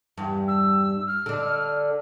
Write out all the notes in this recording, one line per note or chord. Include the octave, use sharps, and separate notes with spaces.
E2 G2
E6
F6
D3 D4